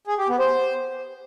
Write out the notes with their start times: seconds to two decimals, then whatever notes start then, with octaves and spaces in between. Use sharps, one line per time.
0.07 G#4
0.18 G4
0.29 B3
0.39 C5